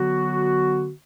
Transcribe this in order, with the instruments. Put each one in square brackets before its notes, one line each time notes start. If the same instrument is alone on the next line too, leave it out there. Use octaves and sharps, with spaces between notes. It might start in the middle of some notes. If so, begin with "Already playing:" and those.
Already playing: [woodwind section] D3 F#3 B3 F#4